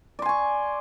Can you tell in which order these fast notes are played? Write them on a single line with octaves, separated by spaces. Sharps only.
D5 C6 G#5 C#6